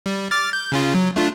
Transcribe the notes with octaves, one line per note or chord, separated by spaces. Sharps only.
G3
D6 F6 A6
G6
C#3 C#4 F4
F#3
A3 D4 F4